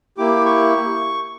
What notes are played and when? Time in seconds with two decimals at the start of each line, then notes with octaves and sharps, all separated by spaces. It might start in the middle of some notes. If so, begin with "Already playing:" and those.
0.18 A#3 E4 G4 D6
0.45 C#6